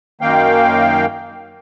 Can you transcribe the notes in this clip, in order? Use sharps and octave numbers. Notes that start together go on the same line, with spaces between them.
F#2 D#3 A#3 F5 G5